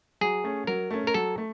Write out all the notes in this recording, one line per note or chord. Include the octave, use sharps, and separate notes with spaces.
F#3 G#4
A3 C#4
F#3 A#4
A3 C#4
A#4
F#3 A4
A3